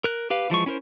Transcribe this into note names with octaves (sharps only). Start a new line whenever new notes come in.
A#4 F#6
G4 B4 F5
E3 F3 G#3 C#6
C#4 E4 A#4 C5